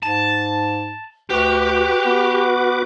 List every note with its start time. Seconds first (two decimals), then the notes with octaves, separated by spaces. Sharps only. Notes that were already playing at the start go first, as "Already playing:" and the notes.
0.03 G#2 A5
1.30 D2 F#4 G4 B4 D6
2.06 B3